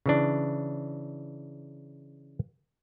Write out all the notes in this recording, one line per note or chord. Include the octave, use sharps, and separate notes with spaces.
C#3 E3 D4